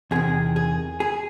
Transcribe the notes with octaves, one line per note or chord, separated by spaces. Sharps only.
E2 C3 D#3 G#4
G#4
G#4